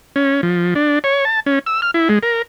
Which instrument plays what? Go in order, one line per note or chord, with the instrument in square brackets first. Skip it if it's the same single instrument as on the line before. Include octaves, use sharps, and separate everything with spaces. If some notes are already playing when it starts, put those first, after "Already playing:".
[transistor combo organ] C#4
F3
D4
C#5
A5
C#4
E6
F6
E4
G#3
A#4